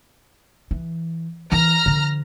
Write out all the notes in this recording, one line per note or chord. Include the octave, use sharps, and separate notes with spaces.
E3
E3 E4 A#5 F6
D3 F3